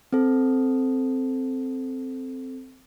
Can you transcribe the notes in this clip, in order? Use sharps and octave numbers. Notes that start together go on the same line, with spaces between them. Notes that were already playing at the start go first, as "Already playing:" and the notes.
C4 A4